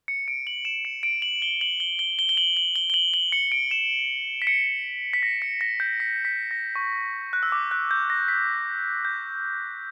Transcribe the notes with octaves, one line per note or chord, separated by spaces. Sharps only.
C#7
D7
F#7
E7
C#7
D7
F#7
G7
F#7
G7
G7
G7
G7
F#7
F#7
G7
G7
F#7
F#7
C#7
D7
E7
B6
C#7
B6
A#6
C#7
A#6
G6
B6
B6
A#6
C#6
F#6
E6
D6
F#6
G6
A#6
B6
G6